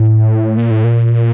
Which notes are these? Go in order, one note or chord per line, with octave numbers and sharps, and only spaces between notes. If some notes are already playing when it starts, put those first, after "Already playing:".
Already playing: A2
A#2
A2
A#2